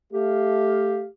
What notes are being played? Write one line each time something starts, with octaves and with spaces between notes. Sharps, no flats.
A3 G4 F5